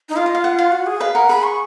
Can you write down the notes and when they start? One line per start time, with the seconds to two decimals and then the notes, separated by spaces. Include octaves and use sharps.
0.09 D#4
0.16 F4 F5
0.26 D#5
0.35 F5
0.44 F#5
0.59 F5
0.72 F#4
0.87 G#4
1.00 B4 F5
1.14 A#4 F#5
1.29 G#4 B5
1.43 C#6